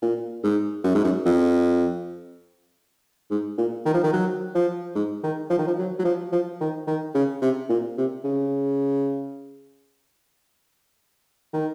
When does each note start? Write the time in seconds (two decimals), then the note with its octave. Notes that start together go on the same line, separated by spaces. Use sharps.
0.02 A#2
0.44 G#2
0.84 F#2
0.95 G#2
1.04 F#2
1.25 F2
3.30 G#2
3.58 A#2
3.85 D#3
3.94 F3
4.03 D#3
4.13 F#3
4.55 F3
4.95 G#2
5.23 D#3
5.50 F3
5.58 D#3
5.67 F3
5.78 F#3
5.99 F#3
6.05 F3
6.32 F3
6.60 D#3
6.87 D#3
7.14 C#3
7.42 C3
7.69 A#2
7.97 C3
8.24 C#3
11.53 D#3